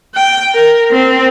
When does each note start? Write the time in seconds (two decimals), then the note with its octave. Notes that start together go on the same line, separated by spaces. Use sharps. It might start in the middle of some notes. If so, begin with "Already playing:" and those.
0.15 G5
0.55 A#4
0.91 C4